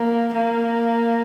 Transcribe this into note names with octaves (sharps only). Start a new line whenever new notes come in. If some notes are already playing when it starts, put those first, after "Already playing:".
Already playing: A#3
A#3